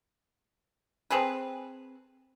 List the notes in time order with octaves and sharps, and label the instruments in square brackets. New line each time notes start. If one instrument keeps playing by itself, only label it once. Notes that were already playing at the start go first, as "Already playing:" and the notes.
[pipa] C4 G#4 A4 B4